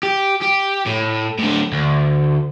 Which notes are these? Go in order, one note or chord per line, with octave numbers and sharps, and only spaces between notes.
G4
G4
A2
A2 D3
D2